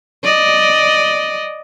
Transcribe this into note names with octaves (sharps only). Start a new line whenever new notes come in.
D5 D#5